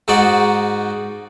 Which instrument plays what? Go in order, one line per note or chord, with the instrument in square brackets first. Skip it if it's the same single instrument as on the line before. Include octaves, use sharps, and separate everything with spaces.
[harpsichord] G#2 D#4 F#4 D5